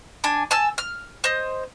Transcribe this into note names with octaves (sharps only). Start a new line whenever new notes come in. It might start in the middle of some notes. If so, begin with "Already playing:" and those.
D4 G#5
G#5 A5 E6
F6
C5 D#5